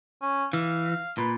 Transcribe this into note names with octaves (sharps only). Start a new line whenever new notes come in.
C#4
E3 F5
A#2 B4